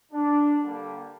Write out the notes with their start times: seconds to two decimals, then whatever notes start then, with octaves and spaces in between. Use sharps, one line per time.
0.12 D4
0.60 D3 G3 A#3